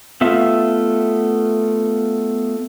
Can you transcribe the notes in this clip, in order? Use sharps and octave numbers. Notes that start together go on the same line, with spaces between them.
A3 B3 F4 E5